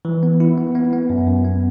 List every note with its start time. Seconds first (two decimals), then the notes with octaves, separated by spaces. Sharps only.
0.05 E3
0.23 B3
0.40 E4
0.57 B3
0.75 B3
0.93 B3
1.10 F#2
1.27 F#2
1.45 B3